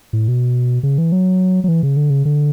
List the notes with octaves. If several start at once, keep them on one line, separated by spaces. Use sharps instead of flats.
A2
B2
C#3
E3
F#3
F#3
E3
C#3
D3
C#3
D3